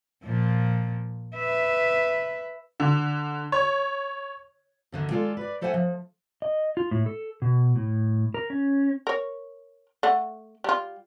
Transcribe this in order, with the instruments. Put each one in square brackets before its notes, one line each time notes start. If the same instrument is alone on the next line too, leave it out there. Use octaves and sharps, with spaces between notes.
[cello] A#2 F3
B4 E5
[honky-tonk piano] D3
C#5
[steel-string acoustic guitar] D2 D3 D#3
D#3 G#3 F4 A4 D5
B4 D5
A3 A4 C5 E5 F#5 G#5
F3
[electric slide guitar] D#5
F4
A2
A4
B2
A2
A#4
C#4
[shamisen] A#4 C#5
A3 F#5
G3 F4